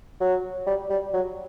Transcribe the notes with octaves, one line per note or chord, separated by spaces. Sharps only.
F#3
G3
G3
F#3